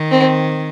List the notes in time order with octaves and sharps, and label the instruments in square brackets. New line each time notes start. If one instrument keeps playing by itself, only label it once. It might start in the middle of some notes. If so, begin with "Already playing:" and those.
Already playing: [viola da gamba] D#3
[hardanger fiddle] C4